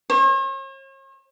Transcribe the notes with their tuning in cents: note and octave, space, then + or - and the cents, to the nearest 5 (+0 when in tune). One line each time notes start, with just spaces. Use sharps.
C#5 -45